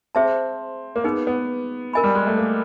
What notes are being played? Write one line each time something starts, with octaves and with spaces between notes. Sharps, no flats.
C4 G#4 C5 E5 A5
A#3
B3 D#4 G#4 B4
B3
A#4 D#5 G#5 B5
G3
G#3
A3
A#3